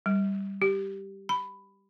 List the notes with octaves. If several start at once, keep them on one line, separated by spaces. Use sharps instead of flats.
G3
G4
B5